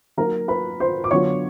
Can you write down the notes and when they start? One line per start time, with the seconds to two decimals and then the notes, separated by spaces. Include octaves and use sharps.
0.17 F#3 A#3 D#4 A#4 A#5
0.48 B4 B5
0.80 C5 C6
1.04 D6
1.10 D3 F#3 B3 D4 F4 C#5 C#6